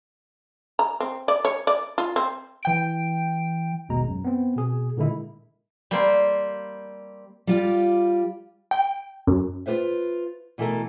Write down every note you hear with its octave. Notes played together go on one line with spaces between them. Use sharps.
A#5
C4
D5
C#5
D5
F4
C4
E3 G5 D7
G#1 D#2 B2 G#3 A#5
F#2
B3 C4
B2 G#4
A#2 D3 D#3 G#3 E4
G3 A#3 C4
G3 F4 G4
G5
F#2
F4 G4 B4 C5 E5
B2 E3 A3 A4 A#4